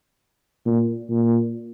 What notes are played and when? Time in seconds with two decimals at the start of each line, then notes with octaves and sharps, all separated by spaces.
0.66 A#2
1.10 A#2